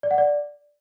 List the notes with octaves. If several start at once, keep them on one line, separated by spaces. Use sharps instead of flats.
D5
F#5
D5